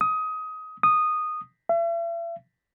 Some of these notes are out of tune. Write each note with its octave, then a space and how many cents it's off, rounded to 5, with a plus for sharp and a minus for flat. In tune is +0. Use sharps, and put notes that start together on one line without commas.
D#6 +20
D#6 -10
E5 +40